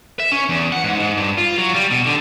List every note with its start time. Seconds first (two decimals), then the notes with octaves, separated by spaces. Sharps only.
0.20 E5
0.32 C#4
0.49 E2
0.72 F#5
0.84 G#2
1.00 G#2
1.17 G2
1.38 F4
1.58 F#3
1.74 G3
1.91 B2
2.06 D3